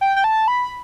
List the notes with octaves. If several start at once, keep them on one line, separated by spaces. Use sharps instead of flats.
G5
G5
A5
B5